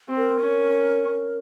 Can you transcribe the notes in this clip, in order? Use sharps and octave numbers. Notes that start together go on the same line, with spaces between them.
C4
A#4
C#4